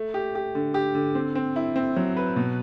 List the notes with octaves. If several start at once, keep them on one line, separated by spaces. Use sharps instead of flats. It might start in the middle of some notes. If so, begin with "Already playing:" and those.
Already playing: A3
G4
G4
D3
G4
D3
C4
C4
E4
C4
F#3
B4
B2